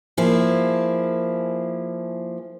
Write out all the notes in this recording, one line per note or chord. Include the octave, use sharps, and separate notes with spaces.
F3 A#3 E4 G#4